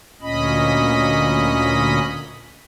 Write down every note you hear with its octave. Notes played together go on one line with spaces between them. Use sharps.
D2 A#2 C#4 D#5 B5